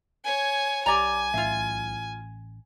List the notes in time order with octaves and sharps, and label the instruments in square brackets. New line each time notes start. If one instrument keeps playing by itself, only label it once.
[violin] C#5 G#5
[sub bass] B1 [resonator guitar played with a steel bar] G4 D5 A#5 [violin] G#5
[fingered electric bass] A1 [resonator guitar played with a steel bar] F4 E5